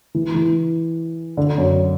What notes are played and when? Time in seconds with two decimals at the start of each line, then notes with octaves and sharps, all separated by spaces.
0.15 E3
0.35 E3
1.37 D3
1.58 F#2